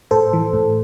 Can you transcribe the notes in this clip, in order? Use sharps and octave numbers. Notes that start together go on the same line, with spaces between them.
A2 A4 C5
E3
A2